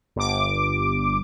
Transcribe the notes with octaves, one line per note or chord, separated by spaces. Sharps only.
G1 D6